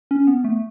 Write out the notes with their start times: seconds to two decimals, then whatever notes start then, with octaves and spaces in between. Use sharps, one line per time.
0.11 C#4
0.27 B3
0.44 A3